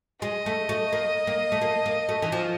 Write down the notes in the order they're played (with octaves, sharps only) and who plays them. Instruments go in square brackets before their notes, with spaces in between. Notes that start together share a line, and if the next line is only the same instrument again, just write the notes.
[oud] G#3 [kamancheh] D#5
[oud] A3
A3
A#3
A#3
A3
A#3
A#3
A3
E3
F3